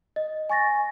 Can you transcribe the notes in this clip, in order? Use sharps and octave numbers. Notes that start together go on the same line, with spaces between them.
D#5
G#5 C#6 A6 A#6